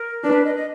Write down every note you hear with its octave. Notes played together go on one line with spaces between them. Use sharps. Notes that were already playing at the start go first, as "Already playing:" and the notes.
Already playing: A#4
D4 B4
D#5
D#5